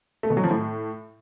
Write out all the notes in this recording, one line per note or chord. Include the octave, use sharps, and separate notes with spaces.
A3
B2
F#3
F3
A2